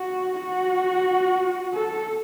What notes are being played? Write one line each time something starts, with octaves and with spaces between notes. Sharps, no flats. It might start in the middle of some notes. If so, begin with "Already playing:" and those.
Already playing: F#4
F#4
A4